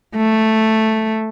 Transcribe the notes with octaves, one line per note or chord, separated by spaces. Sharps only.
A3